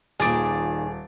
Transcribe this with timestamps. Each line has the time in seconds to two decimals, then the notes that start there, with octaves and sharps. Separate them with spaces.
0.20 D#1 A#2 D#3 G#4 D6 A6 D7